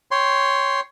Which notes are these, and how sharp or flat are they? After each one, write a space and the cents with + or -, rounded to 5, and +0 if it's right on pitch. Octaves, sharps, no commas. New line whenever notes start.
C#5 +0 G5 +0 C6 +0